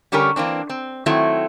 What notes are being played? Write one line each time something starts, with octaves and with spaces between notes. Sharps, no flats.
D3 G3 C#4 G4 A#4
E3 A#3 C4 D4
C4
D#3 F#3 A3 C4 E4